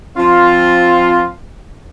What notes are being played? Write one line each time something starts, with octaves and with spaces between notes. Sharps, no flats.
F3 C4 F4